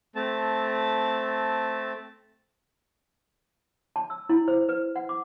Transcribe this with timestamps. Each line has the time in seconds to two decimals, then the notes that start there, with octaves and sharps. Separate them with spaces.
0.16 A3 C4 A5
3.96 A5
4.10 E6
4.29 E4
4.48 C5
4.69 B4
4.96 F#5
5.09 D6